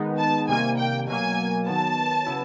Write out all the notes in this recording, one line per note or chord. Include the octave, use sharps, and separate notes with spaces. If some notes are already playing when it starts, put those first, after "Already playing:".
Already playing: D#3 G#3 B3 D#4
A5
C3 D#3 G3 A#3 G#5
G5
B2 F#3 A#3 G#5
D#3 F#3 B3 A5
C#3 F#3 B3 E4